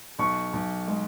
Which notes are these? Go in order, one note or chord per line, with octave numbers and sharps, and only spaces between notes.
B1 C#6
B1
G#3